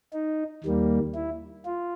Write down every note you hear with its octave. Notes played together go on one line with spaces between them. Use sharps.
D#4
D#2 D#3 G3 A#3
E4
F4